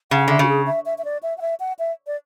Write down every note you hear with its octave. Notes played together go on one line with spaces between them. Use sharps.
C#3 F#5
D3 E5
C#3 F#4
G#4
E5
E5
E5
D5
E5
F#5
E5
F#5
E5
D5